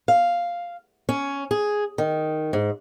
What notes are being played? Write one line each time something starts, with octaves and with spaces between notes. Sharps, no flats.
F5
C#4
G#4
D#3
G#2